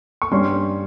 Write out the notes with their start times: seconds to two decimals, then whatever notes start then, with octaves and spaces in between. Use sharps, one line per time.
0.22 C#6
0.32 G2 G3 C#4 C6